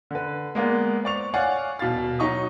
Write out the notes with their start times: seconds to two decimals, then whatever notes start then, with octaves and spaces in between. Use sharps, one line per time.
0.11 D3 B4
0.55 G#3 A#3 B3 D5
1.04 C5 D5 C#6 F7
1.34 C#5 D5 F5 F#5 G#5 C#6
1.79 D#1 B2 F5 A6
2.19 F#3 D#4 C#6 D#6